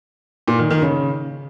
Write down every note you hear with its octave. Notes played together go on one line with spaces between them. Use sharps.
A#2
D#3
D#3
C#3